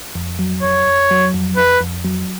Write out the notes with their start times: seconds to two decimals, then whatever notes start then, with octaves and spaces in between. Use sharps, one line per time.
0.15 F2
0.39 F#3
0.63 F2 C#5
0.87 F2
1.11 F#3
1.34 F2
1.57 F2 B4
1.81 F2
2.05 F#3